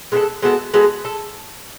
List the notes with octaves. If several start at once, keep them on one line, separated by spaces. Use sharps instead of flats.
G#3 B3 F#4 A4
G#3 B3 F#4 A4
G#3 B3 F#4 A4
A4